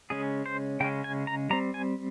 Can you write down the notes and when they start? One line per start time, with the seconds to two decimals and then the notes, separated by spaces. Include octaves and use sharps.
0.10 C#3 G#3 C#4 G#4
0.46 C5
0.80 C#3 G#3 C#4 G5
1.04 G#5
1.27 A#5
1.50 G3 C4 A#5
1.74 G#5